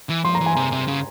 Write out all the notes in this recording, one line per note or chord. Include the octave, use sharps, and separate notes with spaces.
E3
F3 C6
A#5
E3
G#5
C3 A#5
C3
C#3